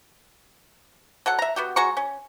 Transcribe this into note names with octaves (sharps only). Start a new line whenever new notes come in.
F#3 A4 F#5
E5 A#5
B3 F#4 G4
G#3 F#4 A#5 C#6
C#4